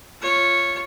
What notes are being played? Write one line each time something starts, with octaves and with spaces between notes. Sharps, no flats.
F4 C#5